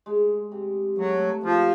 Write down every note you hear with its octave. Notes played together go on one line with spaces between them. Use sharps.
G#3
C3
F#3 A3
C3 F3